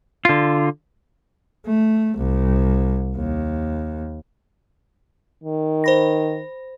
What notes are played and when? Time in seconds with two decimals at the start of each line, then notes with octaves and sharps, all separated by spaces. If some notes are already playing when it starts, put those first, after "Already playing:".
0.25 D3 F4
1.66 A3
2.18 C2
3.16 D#2
5.44 D#3
5.84 C5 B5 A#6